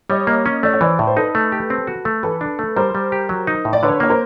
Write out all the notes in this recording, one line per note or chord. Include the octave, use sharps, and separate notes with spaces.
G3 C#5 D#5
A#3
C#4
A3 D5
C#5
E3 C5 D5
A2
C5
D#4 A4 B4
A3
G4
C4
F#4
A3
E3 A4 B4
D4
A3
G3 A#4 C5
G3
G4
F#3
D#4
A2
D5
D3 B4 C#5
A#3 C#5
A#4 C5